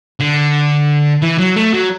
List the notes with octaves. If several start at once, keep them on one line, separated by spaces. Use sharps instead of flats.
D3
E3
F#3
A3
F#3